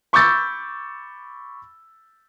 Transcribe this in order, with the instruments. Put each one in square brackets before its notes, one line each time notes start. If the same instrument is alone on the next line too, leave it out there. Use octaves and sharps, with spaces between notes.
[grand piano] B5 C#6 D6 E6 G6 A6